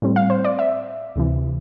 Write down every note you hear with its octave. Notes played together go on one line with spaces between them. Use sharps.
A2 G3 C4
F5
C5
D5
E5
D2 C3 E3